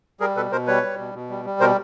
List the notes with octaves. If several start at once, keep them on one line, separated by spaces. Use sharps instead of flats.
G3 G#4 A#4
B2 A4 B4
B2 A#4 C5
G3 B4 C#5
G3
B2
B2
G3
G3
B2 A#4 C5